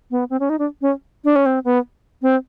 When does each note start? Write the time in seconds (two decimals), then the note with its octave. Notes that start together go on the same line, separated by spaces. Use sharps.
0.11 B3
0.30 C4
0.40 C#4
0.49 D#4
0.59 D4
0.81 C#4
1.24 D4
1.36 C#4
1.46 C4
1.64 B3
2.22 C4